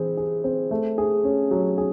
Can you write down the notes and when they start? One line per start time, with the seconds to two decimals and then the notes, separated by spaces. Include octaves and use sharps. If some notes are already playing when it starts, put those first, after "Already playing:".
Already playing: E3 C4 G#4
0.17 G#4
0.44 C4
0.71 A3
0.98 G#4
1.24 C#4
1.51 F#3
1.78 G#4